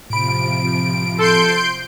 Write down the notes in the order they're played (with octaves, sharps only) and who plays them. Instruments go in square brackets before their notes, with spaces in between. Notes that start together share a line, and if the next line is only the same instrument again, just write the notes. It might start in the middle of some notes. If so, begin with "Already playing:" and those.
[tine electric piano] A2 B5 [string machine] C3 F3 [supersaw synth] D7
[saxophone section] A4 [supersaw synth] C6 G6 D7